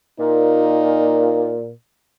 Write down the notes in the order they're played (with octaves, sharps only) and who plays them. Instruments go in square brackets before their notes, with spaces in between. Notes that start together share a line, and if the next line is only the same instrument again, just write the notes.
[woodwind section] A#2 [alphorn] D#4